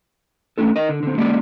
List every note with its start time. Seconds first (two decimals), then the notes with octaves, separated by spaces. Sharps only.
0.58 A3 A#3 C#4 D4 A4
0.76 A#4 D#5
0.89 D3
1.03 D3 C4
1.18 G#3 A#3 C#4 D4 G4 D5